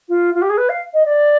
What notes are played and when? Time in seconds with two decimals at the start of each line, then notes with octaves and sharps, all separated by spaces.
0.09 F4
0.34 F4
0.42 G4
0.50 G#4
0.58 B4
0.69 F5
0.94 D#5
1.06 D5